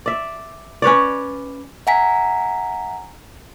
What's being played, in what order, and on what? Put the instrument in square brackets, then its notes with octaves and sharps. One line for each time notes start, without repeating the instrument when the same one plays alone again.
[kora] D5 E5
C#4 B4 C#5 D5
[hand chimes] E5 F#5 G#5 A#5 B6